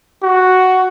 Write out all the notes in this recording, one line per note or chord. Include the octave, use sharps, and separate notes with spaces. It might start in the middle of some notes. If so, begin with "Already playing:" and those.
F#4